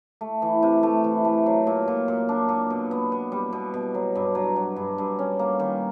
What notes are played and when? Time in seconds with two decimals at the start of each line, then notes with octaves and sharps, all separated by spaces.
0.21 A3
0.42 E3
0.62 C3
0.83 A3
1.04 E3
1.25 A3
1.46 F#3
1.67 A#2
1.88 A#2
2.08 A#2
2.29 D4
2.49 A#2
2.70 B2
2.91 B3
3.12 B3
3.32 G3
3.52 B2
3.74 B2
3.95 F#3
4.15 G2
4.35 F#3
4.56 F#3
4.76 G2
4.98 G2
5.19 C#4
5.39 A#3
5.60 D#3